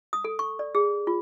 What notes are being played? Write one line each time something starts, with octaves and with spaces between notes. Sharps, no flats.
D#6
A4
C#6
D5
G#4
F4